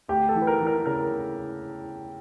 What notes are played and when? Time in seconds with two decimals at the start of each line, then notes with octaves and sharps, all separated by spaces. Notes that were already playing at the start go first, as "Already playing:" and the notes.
0.08 D2 G4
0.29 A4
0.34 E3
0.42 B4
0.47 A#4
0.60 E3
0.67 A#4
0.86 C#3 A#4